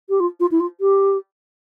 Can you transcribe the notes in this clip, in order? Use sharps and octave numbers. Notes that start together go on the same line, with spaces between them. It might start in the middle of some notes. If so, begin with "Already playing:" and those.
G4
F4
F4
E4
F4
G4